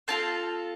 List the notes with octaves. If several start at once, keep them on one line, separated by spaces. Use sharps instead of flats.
C4 F4 A4 A5